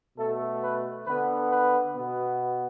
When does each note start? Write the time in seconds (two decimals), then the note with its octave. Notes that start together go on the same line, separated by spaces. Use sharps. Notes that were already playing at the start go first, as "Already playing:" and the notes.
0.17 B2 A3 A4
0.62 B4
1.06 D3 B3 B4
1.50 B4
1.95 B2 B3